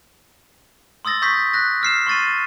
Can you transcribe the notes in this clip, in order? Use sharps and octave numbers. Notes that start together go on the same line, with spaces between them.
C6 D#6 E6 A6 A#6
C#6 D#6 G6 A#6 B6
F#6 A#6
E6 F6 C7 E7
C6 C#6 A6 D#7